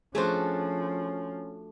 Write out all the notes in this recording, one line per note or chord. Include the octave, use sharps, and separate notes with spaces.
F3 A3 C#4 D4 F#4 G#4 C5